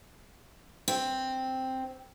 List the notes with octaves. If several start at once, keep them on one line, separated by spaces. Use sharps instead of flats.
C4